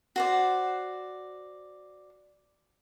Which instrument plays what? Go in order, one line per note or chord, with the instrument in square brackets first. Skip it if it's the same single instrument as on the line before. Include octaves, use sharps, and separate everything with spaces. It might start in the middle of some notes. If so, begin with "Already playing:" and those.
[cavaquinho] F#4 C5 D5